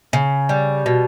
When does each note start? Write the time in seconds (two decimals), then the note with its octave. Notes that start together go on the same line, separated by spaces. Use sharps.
0.13 C#3
0.49 G3
0.86 B2